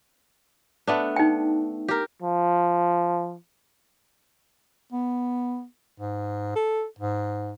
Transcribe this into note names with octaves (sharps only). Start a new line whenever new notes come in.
A3 B3 D4
D#4 G5
G4 A#4
F3
B3
G#2
A4
G#2